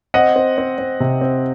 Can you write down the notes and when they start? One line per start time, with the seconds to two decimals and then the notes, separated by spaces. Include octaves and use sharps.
0.14 C4 D#5 F#5
0.36 C4
0.58 C4
0.78 C4
1.00 C3
1.21 C4